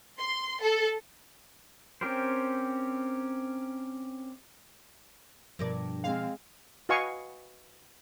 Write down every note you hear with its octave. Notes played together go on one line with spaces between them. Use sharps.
C6
A4
C4 C#4 G4 A#4 C5
G2 B2 F3 A#4 D5
G#3 C4 F5
F#4 B4 D#5 F5 G#5 C#6